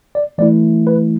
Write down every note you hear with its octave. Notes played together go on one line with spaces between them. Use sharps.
D5
E3 A3 E4 D5
B4